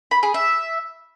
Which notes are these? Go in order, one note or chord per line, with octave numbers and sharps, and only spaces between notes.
B5
G#4
E5